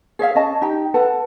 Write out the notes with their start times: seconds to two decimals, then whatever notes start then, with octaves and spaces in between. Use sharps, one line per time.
0.19 G#4 C#5 E5 F5
0.35 C#4 D#5 A5
0.61 D#4 G4 G5
0.94 A4 B4 F#5 A5